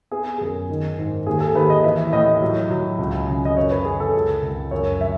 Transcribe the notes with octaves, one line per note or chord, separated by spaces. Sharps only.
B3 G#4
F#2 G#4
D#3
G#2
D#2 G#4
A4
D#2 B4
D#5
E3 E5
A2 D#5
F#3
F#3
C#2
C#3
D#5
F#2 C#5
B4
C#3 G#4
A4
C#2
C#2
F#2 C#5
F#3 E5